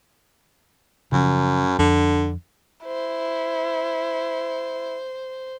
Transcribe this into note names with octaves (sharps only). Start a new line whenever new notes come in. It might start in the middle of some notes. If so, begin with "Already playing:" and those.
F#2 C#3 F3
F2 D3
E4 C5